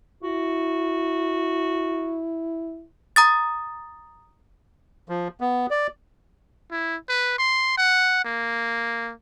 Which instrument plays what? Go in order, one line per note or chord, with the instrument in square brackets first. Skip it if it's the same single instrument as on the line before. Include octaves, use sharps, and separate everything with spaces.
[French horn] E4 [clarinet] F#4
[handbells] A#5 D#6 A6
[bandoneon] F3
B3
D5
[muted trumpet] E4
B4
C6
F#5
A#3